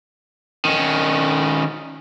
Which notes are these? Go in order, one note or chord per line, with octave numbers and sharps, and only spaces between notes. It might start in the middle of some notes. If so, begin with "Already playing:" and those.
D#3 C#4